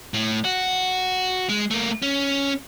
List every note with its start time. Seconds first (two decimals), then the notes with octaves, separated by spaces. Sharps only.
0.14 A2
0.45 F#4
1.49 G#3
1.71 A3 A#3
2.02 C#4